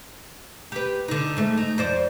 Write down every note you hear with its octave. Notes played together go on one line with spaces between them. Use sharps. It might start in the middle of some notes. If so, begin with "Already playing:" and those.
G4 B4
D3 D#4
G#2 A3
D#4
F2 C5 D5